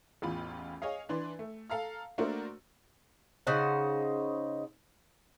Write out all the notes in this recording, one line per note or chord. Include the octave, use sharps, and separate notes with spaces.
A1 E2 F4 B5
G#4 C#5 D#5 F5
E3 D4 B4 C6
A3
A4 F5 A#5 F6
A3 A#3 D4 F#4 A#4 C5
C#3 D#4 C5 F#5